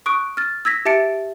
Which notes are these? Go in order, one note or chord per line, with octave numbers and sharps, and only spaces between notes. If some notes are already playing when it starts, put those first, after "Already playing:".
C#6 D#6 F#6 D7
F6 A6
E6 G#6 A#6 B6
G4 E5 A5 A6 C#7 D7